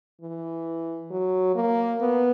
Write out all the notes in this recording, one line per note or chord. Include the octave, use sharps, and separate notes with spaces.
E3
F#3
A#3
B3